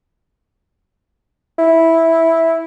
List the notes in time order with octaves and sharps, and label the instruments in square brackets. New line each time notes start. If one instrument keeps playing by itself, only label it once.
[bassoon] E4